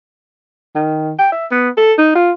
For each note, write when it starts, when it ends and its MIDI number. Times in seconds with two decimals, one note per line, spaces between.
0.75 1.12 51
1.19 1.29 79
1.32 1.46 76
1.51 1.69 59
1.77 1.93 69
1.98 2.12 63
2.15 2.32 65